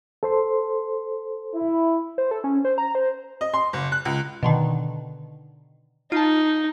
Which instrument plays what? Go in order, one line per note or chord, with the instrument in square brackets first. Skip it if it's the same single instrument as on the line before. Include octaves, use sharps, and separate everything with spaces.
[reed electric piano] A4 C5 C6
[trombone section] E4
[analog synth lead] C5
A4
C#4
C5
A#5
C5
[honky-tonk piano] D#5
C6
F#1
F#6
C#2
[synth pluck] B2 D3 D#3
[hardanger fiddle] D#4 [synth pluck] F4 A5